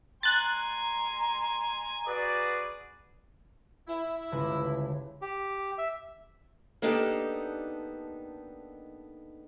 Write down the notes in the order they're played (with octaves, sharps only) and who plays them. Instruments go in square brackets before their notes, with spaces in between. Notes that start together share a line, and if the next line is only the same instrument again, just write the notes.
[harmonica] G#5 C6 [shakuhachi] A#5 [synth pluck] F#6 A6
[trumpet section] F#4 G#4 D5 [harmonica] B4
[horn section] E4
[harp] G1 C#2 B4
[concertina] G4
E5
[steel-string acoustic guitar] A#3 B3 D4 D#4 G4 A4